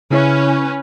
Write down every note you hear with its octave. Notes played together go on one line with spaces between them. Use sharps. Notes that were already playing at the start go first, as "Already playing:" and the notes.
C#3 C#4 E4 B4 C#5